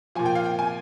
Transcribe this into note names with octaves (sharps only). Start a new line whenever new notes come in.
A#2 F3 G#5
G5
F5
G5
G#5